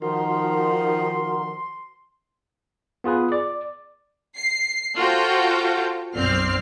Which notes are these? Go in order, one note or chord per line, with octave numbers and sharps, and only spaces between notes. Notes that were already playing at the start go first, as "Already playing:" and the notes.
D#3 F3 F#4 A#4 C6
B3 F4 G#4 B4
D5
C7
F4 F#4 A4 C5 G5
B1 F#2 C4 D5 F6 C7